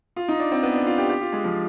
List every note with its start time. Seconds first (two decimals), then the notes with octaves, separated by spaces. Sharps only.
0.16 F4
0.28 D#4
0.40 D4
0.52 C4
0.63 B3
0.75 D4
0.86 F4
0.98 G4
1.10 G4
1.21 F4
1.33 G#3
1.44 F3